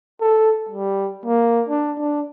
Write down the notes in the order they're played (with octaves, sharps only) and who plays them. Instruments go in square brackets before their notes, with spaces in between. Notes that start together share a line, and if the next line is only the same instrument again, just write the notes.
[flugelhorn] A4
G3
A#3
D4
D4